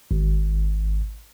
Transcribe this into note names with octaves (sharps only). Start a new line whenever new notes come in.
G#1